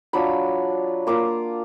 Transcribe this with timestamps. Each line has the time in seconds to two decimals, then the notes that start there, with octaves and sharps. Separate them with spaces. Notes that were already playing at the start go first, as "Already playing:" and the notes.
0.13 F#3 D4 F4 B5
1.07 A#3 F4 D6